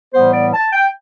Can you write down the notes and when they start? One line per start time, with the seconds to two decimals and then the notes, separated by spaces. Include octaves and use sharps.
0.14 A2 E3 G3 B3 C5
0.34 D5
0.53 A5
0.73 G5